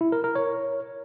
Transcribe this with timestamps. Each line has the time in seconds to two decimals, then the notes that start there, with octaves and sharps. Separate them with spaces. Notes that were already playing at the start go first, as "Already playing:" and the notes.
0.01 E4
0.12 A#4
0.24 A#4
0.35 C#5